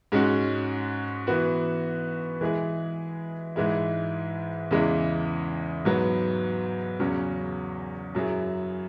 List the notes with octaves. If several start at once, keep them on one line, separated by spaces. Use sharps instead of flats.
G#2 G#3 C#4 F#4
E3 B3 F#4
E3 G#3 E4 G#4
G#2 E3 G#3 E4
E2 C#3 E3 G#3 E4
G#2 F#3 B3
E2 C#3 F#3 C#4
F#2 F#3 E4 G#4